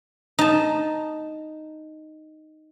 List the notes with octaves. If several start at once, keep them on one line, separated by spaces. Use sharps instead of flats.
D#4 A5